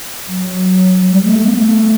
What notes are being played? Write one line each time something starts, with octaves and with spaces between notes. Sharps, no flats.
F#3
G3
A3
A3
B3
A3